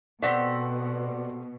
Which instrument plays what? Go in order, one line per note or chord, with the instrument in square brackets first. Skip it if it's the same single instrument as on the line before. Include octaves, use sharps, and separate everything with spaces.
[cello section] B2 [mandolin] A3 C4 G4 [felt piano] D5 F#5